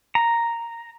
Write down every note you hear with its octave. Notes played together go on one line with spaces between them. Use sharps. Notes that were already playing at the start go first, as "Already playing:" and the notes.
A#5